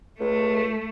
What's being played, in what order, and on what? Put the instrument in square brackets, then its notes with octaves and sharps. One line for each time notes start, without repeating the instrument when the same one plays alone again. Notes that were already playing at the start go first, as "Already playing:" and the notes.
[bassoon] C#2 [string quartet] A3